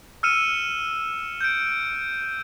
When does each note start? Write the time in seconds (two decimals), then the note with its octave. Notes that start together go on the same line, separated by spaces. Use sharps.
0.23 E6 F6 C#7 D#7 E7
1.41 G6 D7